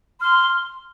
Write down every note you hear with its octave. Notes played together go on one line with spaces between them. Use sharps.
C6 F6